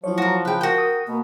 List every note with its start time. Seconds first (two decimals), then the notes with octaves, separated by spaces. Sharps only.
0.04 F3 F#3 E4 C#5
0.18 F#4 A#4
0.45 C#3 B4 G5
0.61 F#4 A#4 G5
0.78 D#6
1.07 B2 A#3